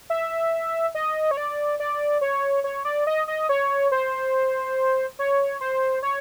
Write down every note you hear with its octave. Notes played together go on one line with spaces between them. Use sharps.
E5
D#5
C#5
D5
D5
C#5
C#5
D5
D#5
D#5
C#5
C5
C#5
C5
C#5